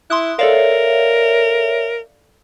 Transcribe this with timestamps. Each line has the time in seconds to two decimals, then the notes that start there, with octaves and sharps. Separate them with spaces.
0.10 E4 C6 D#6 F#6
0.39 A4 A#4 C#5 D5 E5 F5